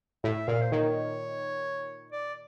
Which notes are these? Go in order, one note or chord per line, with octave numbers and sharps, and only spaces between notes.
A2 E5
A#2 F5
C5
D#3 C#5
D5